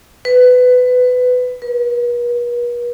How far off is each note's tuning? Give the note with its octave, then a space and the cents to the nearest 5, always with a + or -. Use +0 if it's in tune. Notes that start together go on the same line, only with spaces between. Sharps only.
B4 +20
B4 -45